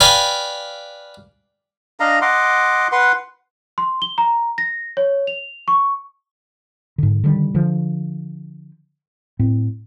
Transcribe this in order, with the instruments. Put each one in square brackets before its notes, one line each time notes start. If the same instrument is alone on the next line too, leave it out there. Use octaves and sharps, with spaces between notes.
[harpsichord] B4 D5 F5 G5 G#5
[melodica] D4 D#5 F5 A#5
D#5 F#5 C6 D6
B4 F#5 C6
[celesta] C6
G7
A#5
A#6
C#5
F7
C#6
[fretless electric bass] G#2 D3
D3 D#3 G3
D3 F3
A2 C4